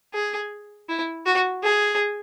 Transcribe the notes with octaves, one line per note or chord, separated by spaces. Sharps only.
G#4
E4
F#4
G#4